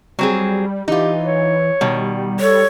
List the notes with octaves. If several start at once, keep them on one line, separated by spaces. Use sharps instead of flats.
F#3 G3 C4 G#4
E3 D#4 F4 G4
C#5
B2 D#3 G3
A4 C#5